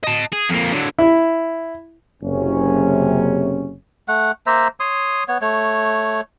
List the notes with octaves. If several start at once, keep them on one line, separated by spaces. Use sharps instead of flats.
D#5 A5
G#4
F2 A#3
D3 F#3
E4
F#1 C3 C#4
A3 F#5
A#3 C5 E5 A#5
C#5 C6 D#6
B3 C#5
A3 C#5